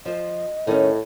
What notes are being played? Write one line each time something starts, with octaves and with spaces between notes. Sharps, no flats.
F3 C5 D#5
A2 D#3 C#4